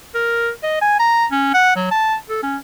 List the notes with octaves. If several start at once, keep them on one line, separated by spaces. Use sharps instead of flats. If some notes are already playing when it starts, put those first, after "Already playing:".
A#4
D#5
G#5
A#5
C#4
F#5
F#3
A5
A4
C#4